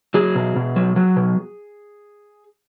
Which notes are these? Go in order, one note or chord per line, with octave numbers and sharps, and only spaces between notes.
F#3 G#4
B2
B2
F#3
F#3
B2